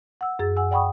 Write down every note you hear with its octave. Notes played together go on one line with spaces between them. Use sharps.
F#5 E6
F#2 G#4 E6 A6
F#5 G#5 E6
D5 F#5 G5 B5 C#6 D#6